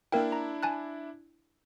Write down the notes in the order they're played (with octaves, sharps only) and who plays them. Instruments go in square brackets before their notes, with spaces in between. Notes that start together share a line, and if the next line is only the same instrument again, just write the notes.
[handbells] A#3 A#4 G5 [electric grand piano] D4 E4
[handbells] A#5
G#5 A5 F#6